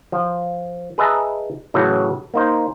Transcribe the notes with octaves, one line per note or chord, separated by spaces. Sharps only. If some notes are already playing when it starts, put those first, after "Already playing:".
F3
G#4 B4 D#5 E5 A5 A#5
A2 C#3 E3 F#3 F#4
A#3 D#4 C5